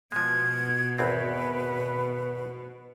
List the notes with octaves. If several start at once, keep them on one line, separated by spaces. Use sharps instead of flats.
B2 F3 G#3 G#6
G#1 E2 C4 B4